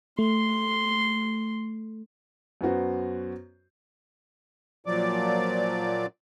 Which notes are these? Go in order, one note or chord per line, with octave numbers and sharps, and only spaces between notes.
A3 C6
F#2 B3 F#4 C5
A#2 F3 F#3 D5 D6